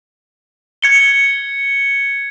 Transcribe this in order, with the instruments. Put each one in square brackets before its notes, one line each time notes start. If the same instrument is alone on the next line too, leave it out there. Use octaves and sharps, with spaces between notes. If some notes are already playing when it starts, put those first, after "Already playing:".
[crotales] G#6 C#7 G7